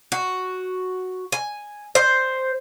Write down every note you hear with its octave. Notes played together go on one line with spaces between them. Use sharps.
F#4
G#5
C5